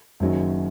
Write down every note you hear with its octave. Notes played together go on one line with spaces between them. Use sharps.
F#1 F#2 D#3 F#3 C#4